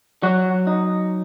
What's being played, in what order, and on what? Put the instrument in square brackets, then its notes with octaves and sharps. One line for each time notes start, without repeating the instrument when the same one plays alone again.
[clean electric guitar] F#3 F#4
D#4